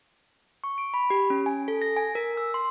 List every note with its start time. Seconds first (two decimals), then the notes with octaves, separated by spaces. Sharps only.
0.64 C#6
0.78 D7
0.94 B5
1.10 G4
1.30 C#4
1.46 G#5
1.68 A4
1.82 A#6
1.97 G#5
2.15 A#4
2.37 E6
2.54 C6